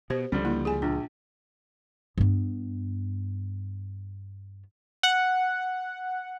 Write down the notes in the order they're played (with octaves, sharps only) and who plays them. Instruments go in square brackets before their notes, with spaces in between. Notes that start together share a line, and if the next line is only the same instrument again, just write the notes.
[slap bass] B2 [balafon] G4 C5
[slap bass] C#2 F3 [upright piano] D3 G3
[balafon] A#3 E4
G#4 G#5
[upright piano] A#1 [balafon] D4
[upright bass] G2 B3
[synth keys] F#5